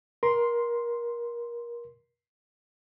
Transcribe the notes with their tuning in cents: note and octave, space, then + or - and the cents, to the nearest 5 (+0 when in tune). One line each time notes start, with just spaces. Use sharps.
A#4 +25 C6 +0